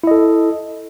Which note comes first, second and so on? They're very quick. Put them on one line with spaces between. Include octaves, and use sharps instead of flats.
E4 D#5 A4